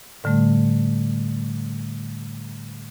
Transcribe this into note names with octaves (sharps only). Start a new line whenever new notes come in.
A2 D3 G3 A3